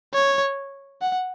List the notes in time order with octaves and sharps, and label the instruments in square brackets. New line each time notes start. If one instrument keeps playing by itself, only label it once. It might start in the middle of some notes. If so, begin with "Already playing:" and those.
[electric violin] C#5
F#5